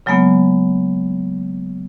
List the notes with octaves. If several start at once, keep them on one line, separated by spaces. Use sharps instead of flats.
C#3 F#3 G#3 A#3 B3